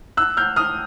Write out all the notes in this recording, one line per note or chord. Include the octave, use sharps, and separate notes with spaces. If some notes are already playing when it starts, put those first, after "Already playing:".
E6 F#6
F6 G6
D#6 F6